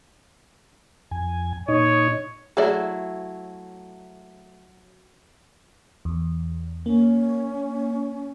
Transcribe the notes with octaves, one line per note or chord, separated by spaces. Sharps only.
F2 G#5
A#2 D#4 C#5 D#5
F#3 A3 E4 G#4 D5 E5
E2
A#3 C#4